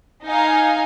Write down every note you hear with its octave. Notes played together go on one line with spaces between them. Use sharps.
D#4 F5 G#5